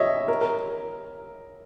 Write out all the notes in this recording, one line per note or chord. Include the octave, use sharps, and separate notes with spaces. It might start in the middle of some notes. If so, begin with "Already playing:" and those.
Already playing: C#5 D#5 E5
A#4
A#4